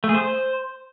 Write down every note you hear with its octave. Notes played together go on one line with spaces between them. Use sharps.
A3
G#4
C5